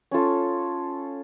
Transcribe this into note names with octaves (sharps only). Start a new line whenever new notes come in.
C#4 F4 A4